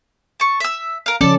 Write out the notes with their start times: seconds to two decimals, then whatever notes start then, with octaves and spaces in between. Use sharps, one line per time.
0.40 A5 C#6
0.60 E5 E6
1.06 A#4 F5
1.21 C#3 F3 C#4 A4 D5 A5